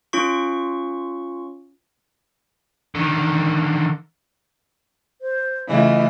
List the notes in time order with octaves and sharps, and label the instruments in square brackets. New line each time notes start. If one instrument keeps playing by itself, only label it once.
[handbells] C#4 F4 C#6
[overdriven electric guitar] D3 D#3
[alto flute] C5
[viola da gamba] C#3 A3 F4 [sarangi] E3 [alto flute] D#5